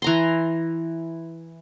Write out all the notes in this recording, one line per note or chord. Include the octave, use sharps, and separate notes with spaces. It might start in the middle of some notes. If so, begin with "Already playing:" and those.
E3 A#5 C6